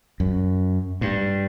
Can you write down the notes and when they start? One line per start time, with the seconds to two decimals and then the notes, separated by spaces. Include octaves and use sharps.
0.20 F#2
1.01 G2